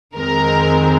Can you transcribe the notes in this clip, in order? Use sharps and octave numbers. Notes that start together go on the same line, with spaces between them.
F2 D#3 G#3 C4 A#4